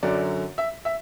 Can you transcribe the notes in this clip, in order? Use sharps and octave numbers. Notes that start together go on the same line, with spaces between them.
F#2 D3 F#3 D5
E5
E5